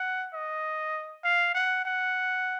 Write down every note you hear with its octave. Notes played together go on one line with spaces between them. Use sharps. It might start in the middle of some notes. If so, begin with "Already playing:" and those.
Already playing: F#5
D#5
F5
F#5
F#5